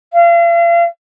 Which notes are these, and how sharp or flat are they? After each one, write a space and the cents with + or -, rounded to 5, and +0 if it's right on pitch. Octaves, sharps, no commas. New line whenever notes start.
F5 -40